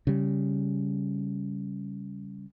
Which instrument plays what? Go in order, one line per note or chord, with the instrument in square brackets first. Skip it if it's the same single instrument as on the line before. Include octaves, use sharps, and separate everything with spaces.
[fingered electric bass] C#3 G3